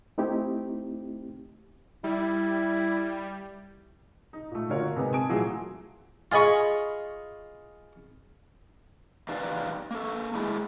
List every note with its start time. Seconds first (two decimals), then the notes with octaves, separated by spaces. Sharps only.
0.18 A3 C4 D#4 E4 G4
2.04 G3 E4
4.33 D#4
4.51 A#2 A3
4.69 D3 A#3 F4 F#4 A#4 C#5
4.96 C3 G#3 B3 C4 D#4
5.13 G#5 A5 D#6 D7
5.29 A#2 E3 F#3 A3 G#4
6.32 F4 G#4 D#5 B5 C#6
9.29 E2 D#4 G4 B4 D5 F5
9.91 A#3 A4
10.35 G#3 A3 E4 G#4